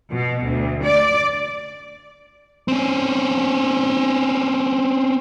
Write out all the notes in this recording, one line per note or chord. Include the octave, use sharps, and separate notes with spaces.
B2
D2
D5
C4 C#4